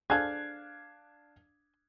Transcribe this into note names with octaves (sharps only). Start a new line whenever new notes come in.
D4 G#4 A4 C5 F5 F#6 G#6